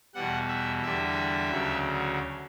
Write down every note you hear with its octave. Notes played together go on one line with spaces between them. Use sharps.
E2 B2 G3 F#5
E5
E2 D3 G3 E5
D2 C#3 F#3